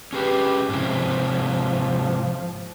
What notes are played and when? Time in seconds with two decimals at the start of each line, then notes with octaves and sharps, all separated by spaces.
0.13 C#4 G4 G#4 B4
0.69 G#2 C3 F3 E4